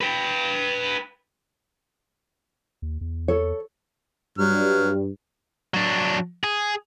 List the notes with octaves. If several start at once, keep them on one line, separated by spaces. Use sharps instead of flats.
B4 G5
D#2
E2
A4 C#5
G2 F#3 F6
F#3 D4
G#4